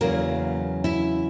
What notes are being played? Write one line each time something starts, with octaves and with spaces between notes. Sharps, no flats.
E2 C#3 F#3 A#3 C#4 E4 A#4
E4 E5